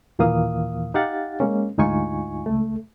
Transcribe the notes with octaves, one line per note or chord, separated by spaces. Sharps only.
D#2 A#2 E3 A#3 F5 D#6
D#4 G4 F5 F#5 A6
G#3 A#3 C#4
D2 G#2 D#4 F4 G#5 C#6
C#2 A3